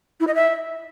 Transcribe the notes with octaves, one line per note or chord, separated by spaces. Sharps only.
E4
D#5
E5